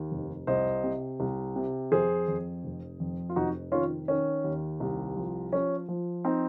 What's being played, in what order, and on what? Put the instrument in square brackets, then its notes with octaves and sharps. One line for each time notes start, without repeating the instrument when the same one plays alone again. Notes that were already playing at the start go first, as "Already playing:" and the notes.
Already playing: [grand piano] D#2
F1
C2 C5 D#5
C3
C2
C3
F2 G#4 C5
F2
F1
F2
F4
F1 D#4 F#4
D#3 C#4 F4
D#3 C#4
D#2
C2
F3
F3 C#4
F3
C4 D#4